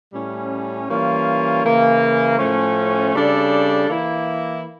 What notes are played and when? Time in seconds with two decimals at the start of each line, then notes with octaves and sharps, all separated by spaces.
0.13 A2 G3 C#4
0.89 E3 G3 A#3 C#4 F4
1.63 C#3 E3 A#3
2.38 A2 F3 A3 C#4
3.13 C#3 G3 D4 A4 D5
3.88 E3 A#3 E4